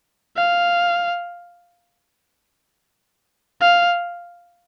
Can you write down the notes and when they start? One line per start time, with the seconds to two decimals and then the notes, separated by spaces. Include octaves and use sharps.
0.36 F5
3.61 F5